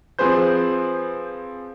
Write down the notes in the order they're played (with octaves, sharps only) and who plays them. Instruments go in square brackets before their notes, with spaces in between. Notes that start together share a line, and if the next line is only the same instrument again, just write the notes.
[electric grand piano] F3 C4 G#4 B4 C5 G6